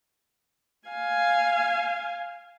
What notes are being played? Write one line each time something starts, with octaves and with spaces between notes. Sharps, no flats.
F5 G#5